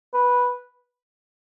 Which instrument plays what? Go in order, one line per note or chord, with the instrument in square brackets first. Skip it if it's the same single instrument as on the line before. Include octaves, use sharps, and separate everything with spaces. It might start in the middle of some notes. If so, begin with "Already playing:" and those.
[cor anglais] B4